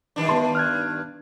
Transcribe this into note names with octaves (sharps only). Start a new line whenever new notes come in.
G2 D#3 D4
B3 A5 C6
F6 F#6 G#6